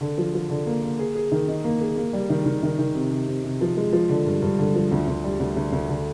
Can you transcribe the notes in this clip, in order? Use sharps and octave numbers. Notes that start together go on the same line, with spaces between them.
D3
F3
F3
D3
A#3
A#3
G#4
G#4
D#3
D#4
A#3
G#4
A#3
G3
D#3
D#3
D#3
D#3
C3
C3
C3
C3
F3
G#3
F3
D3
G2
G2
D3
F3
D2
D2
G3
D2
D2
D2
D3